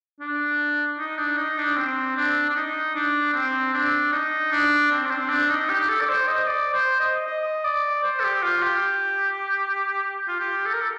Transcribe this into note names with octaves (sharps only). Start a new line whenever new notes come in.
D4
D#4
D4
D#4
D4
C4
D4
D4
D#4
D4
C4
D4
D#4
D4
C4
D4
C4
D4
D#4
G4
A4
D5
C5
D#5
D5
C5
D#5
D#5
D5
C5
A4
G4
F4
G4
F4
G4
A4
A#4
A4